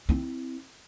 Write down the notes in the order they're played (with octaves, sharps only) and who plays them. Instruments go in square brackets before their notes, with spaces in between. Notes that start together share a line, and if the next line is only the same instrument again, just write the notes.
[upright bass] C4 E4